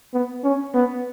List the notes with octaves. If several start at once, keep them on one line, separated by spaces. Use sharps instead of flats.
B3
C#4
B3